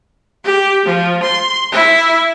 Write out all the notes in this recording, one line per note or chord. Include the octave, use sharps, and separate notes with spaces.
G4
F3
C6
E4